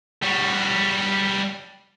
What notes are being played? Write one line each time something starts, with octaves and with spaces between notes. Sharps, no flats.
G3 F#4